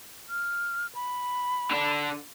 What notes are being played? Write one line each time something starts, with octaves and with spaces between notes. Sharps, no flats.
F6
B5
D3 D4